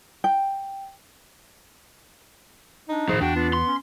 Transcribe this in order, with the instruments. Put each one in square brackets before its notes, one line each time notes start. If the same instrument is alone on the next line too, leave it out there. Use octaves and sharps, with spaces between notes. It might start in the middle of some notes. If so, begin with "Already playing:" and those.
[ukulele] G5
[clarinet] D4 [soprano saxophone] D#4
[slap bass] A2 F3 [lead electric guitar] D#3 G#4 [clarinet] C5
[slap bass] E2 [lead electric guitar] D4 [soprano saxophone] F#4 [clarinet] G5
[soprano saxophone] B3 [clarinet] F4
[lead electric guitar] C6
[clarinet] C#4